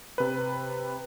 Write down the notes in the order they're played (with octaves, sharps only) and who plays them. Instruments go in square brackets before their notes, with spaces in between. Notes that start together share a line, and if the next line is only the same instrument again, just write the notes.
[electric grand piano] C3 B4